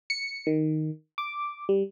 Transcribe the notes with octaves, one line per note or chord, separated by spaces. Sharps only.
C#7
D#3
D6
G3